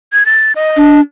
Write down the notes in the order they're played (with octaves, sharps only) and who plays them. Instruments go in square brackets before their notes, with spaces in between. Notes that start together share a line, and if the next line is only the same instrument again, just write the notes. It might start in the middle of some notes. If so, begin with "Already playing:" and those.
[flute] G#6
A6
D#5
[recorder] D4